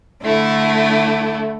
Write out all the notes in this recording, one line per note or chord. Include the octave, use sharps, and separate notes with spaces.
D3 A3 E4